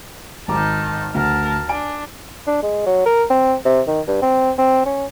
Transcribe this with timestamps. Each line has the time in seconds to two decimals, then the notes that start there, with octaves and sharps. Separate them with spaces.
0.48 G#1 D#3 A5 A#5 D6
1.14 D2 A#4 A5
1.69 D4 G#5 D7
2.47 D4
2.63 G#3
2.86 F#3
3.06 A#4
3.30 C4
3.65 C3
3.87 D#3
4.08 G2
4.22 C4
4.58 C4
4.86 C#4